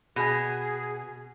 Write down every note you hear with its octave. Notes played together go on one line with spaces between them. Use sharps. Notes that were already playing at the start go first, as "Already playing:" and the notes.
B2 G#4